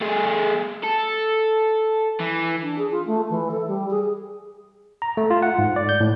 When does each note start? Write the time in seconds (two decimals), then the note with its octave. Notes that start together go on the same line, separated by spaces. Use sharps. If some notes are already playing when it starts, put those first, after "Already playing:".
0.01 A3 G#4
0.83 A4
2.20 E3
2.62 D4
2.78 G#4
2.91 F4
3.06 A3
3.30 E3
3.51 A4
3.67 G3
3.90 G#4
5.02 A#5
5.17 A3
5.30 F4
5.43 F#5
5.59 G#2
5.76 D5
5.89 G6
6.00 A2